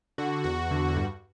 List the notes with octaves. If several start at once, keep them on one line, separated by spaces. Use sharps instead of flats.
D3 F#4
E2 F#4
D3
G2 F#4